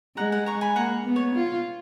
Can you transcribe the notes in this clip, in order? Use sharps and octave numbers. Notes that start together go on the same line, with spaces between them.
G#3 F#5 A#5
F#5 A#5
A#5 C#6
G#5 B5
A#3 F#5 A#5
B3
C#5
F4